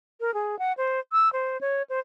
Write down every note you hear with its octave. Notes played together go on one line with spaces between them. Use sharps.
A#4
G#4
F#5
C5
E6
C5
C#5
C5